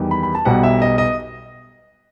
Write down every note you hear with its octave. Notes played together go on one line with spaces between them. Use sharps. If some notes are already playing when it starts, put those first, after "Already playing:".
Already playing: E2 D#3 G3
B5
B5
A5
B1 B2 G3 F#5
E5
D#5
D#5